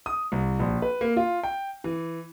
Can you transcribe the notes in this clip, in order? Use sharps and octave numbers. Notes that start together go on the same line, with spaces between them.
D#6
C2
A#1
B4
A#3
F4
G5
E3